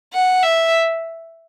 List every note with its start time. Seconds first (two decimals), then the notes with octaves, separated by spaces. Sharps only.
0.13 F#5
0.43 E5